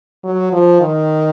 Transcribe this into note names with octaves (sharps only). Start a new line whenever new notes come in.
F#3
F3
D#3